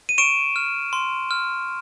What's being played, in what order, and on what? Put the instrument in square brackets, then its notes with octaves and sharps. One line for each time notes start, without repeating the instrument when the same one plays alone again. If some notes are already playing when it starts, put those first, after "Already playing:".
[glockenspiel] D#7
C#6 D7 E7
F6
C6
F6